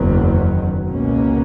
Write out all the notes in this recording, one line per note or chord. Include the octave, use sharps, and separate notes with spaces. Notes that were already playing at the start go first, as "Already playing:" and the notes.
Already playing: F#1 E2 D#3 F#3
C#2 B2 A#3 C#4